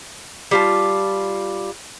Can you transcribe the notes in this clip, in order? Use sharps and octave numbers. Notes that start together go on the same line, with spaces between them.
G3 F4 A5